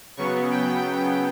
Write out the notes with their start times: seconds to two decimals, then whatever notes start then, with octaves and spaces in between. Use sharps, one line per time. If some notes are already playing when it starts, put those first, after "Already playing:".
0.17 C#3 F#3 B3 C#6
0.51 G5